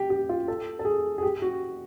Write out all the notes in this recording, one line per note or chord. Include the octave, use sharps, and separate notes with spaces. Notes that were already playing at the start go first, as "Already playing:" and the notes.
Already playing: G4
G4
F4
A4
A4
G#4
G#4
G4
F#4